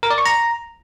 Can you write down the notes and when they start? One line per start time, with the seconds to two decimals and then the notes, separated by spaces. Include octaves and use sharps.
0.03 A#4
0.10 D5
0.18 C#6
0.26 A#5